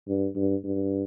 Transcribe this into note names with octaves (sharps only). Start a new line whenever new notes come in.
G2
G2
G2